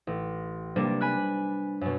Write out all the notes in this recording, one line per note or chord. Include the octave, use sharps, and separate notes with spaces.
A1
C3 G3 A#3 B3 D4
G#5 B5 F#6
F#2 B2